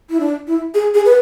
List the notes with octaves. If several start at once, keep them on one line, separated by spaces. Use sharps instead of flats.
E4
D4
E4
G#4
G#4
B4